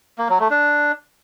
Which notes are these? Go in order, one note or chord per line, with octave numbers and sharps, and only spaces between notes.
A#3
F#3
A3
D4